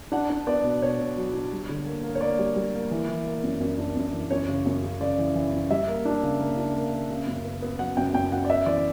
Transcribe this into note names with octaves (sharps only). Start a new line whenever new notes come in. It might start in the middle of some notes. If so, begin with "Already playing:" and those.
D4 F#5
D4
B3 D5
B2
B2 C#5
B2
F#3
D4
G3
D3
A#3
A#3
C#5
A#3 D5
G3
G3
A#3
E3
E3
A#3
F#2
F#2
D4
F#2
E3
F#2 C#5
C#3
F#2
C#3
C#3 D5
E3
E3
F#2
G3 E5
A#3
D4
C#3
A#3
D4
A#3
A#3
C#3
F#2
B3
B3
F#3 F#5
F#2 G5
F#2 G5
F#2 F#5
D5
B3 E5
E3 D5